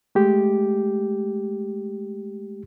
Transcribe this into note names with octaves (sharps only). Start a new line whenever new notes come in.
G#3 A3 G4